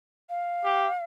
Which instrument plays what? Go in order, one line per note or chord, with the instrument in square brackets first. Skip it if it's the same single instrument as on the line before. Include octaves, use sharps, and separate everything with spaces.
[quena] F5
[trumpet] G4